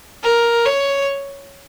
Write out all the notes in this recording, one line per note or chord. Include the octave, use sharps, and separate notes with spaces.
A#4
C#5